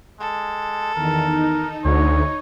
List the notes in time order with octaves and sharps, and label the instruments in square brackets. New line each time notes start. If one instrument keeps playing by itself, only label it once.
[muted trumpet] G#3 [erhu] A4
[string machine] E2 D#3 [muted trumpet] A#4
[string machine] D#4
[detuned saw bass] D2 [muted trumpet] C#5